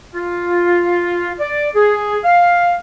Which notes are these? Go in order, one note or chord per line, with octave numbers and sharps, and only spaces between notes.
F4
D5
G#4
F5